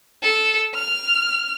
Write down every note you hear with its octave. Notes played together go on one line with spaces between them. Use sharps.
A4
F6